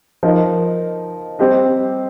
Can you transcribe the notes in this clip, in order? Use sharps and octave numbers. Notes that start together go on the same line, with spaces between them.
F3 D#4 A#4 D#5
G3 C4 G4 C5 D#5